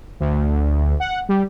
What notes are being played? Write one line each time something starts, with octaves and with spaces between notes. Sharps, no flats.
D2
F#5
G3